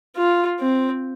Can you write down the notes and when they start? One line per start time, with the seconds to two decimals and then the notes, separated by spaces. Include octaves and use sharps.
0.16 F4
0.59 C4